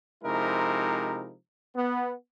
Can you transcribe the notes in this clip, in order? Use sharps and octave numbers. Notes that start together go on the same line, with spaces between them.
C3 F3 G#3 D#4 E4 A#4
B3